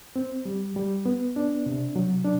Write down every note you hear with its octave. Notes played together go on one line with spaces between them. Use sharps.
C4
G3
G3
B3
D4
C3
F#3
D4